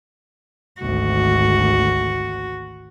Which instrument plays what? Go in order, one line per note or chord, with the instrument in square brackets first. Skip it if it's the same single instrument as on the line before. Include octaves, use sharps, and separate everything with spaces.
[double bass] G#1 D2 [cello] F#4